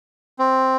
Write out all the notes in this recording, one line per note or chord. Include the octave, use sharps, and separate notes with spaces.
C4